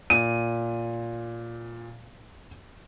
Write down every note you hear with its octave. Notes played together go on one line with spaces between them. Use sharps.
A#2 D#7